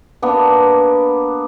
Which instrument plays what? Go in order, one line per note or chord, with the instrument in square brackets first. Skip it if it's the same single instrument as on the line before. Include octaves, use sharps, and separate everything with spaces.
[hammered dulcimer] A#3 B3 D4